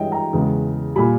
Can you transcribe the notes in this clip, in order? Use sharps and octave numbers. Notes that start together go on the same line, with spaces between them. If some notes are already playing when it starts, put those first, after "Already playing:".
Already playing: G2 E3 G#3 C#5 D#5 E5 G5
G5 A#5
E2 C#3 G#3
A#2 G3 G#5 B5